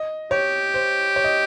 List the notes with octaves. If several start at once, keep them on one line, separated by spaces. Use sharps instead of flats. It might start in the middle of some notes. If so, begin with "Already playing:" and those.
Already playing: D#5
G4 C#5
C5
C#5
D#5